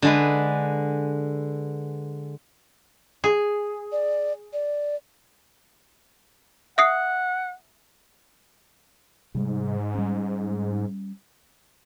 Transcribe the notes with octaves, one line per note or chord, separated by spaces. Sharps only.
D3 G#3 B4
G#4
D5
D5
E5 F#5 D#6 C7
G#2 C3 G3 G#3
G3 C#4